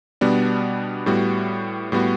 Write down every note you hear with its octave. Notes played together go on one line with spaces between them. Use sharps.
B2 G3 B3 D4
A2 G3 B3 F#4
A2 G3 B3 F#4